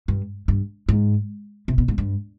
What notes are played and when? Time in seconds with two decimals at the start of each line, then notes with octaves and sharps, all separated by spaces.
0.08 G2
0.48 G2
0.89 G#2
1.68 C3
1.78 B2
1.88 G#2
1.98 G2